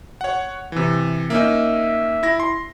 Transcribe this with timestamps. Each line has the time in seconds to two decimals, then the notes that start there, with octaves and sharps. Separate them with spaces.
0.21 C#5 F#5
0.72 C3 E3
1.30 A#3 C#4 D#4 E5
2.23 E4 A#6
2.40 C6